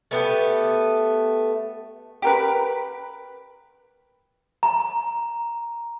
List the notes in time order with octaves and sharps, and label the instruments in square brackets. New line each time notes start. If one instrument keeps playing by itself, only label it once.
[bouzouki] A3 B3 G4
[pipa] G4 A#4 B4
[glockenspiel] A#5